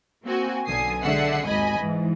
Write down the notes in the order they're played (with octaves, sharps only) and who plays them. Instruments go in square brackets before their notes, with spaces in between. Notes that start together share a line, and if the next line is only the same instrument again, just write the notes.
[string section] A#3 C4 F#4 G#5
B1 D3 G#5 D#6 C7
D3 G#3 E5 F#5 C7
G#1 D#2 D#5 G#5 B5
G#2 E3